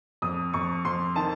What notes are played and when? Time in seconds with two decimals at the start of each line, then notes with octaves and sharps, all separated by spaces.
0.22 F2 D#6
0.53 F2 C#6
0.85 F2 C6
1.16 D#3 A5